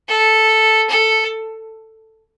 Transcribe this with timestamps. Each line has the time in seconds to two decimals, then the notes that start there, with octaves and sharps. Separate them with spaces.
0.09 A4
0.89 A4